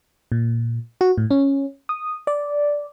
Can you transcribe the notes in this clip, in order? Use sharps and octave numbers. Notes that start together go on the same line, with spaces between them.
A#2
F#4
A2
C#4
D#6
D5